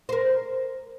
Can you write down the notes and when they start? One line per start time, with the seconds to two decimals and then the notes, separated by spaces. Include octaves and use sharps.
0.09 A#4 C5